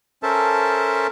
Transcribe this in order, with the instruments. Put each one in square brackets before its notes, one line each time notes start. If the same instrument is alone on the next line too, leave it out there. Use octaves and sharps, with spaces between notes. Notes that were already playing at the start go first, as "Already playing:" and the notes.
[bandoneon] C#4 A4 A#4 C5 E5 A5